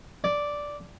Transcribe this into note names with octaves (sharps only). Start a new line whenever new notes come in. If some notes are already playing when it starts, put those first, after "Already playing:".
D5